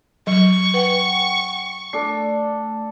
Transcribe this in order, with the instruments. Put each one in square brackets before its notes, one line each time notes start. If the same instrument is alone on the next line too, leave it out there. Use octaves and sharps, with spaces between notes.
[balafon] F#3 [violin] C#6
[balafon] B4 [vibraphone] F#5 G5
[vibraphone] A3 [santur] D4 A4